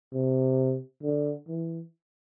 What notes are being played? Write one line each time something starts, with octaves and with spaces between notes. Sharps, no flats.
C3
D3
E3